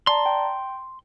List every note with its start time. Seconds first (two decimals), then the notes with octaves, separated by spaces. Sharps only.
0.07 D5 A5 A#5 C6
0.26 G5